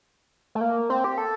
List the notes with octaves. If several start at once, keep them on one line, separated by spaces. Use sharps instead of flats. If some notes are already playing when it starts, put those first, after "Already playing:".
A3
A#3
C4
G4
A4